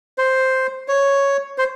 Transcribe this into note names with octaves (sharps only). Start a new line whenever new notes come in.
C5
C#5
C5